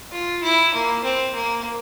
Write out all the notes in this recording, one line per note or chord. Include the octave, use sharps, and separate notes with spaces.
F4
E4
A#3
C4
A#3